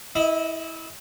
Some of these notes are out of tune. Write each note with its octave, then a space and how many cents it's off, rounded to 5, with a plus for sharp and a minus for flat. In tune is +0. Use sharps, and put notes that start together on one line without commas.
E4 -20 D#5 +15